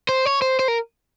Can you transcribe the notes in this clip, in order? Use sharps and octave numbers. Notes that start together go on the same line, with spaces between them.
C5
C#5
C5
C5
A#4